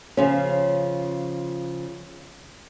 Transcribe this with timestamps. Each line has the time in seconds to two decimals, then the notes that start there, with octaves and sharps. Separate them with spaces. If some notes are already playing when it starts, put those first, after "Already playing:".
0.17 C#3 F3 C#4